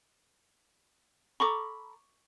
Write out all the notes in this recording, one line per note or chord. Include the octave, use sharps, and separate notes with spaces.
A4 A#5 B5 C#6 D6